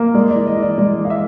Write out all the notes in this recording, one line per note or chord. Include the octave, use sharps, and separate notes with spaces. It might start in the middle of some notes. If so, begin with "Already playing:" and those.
Already playing: A#3
G#3 D5
D5
E3
D#5
E3
D5
G#3 D5
E3
F5
E5